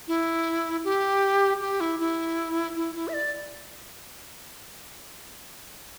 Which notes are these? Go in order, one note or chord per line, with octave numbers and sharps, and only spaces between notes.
E4
G4
G4
E4
E4
E4
E4
E5
D5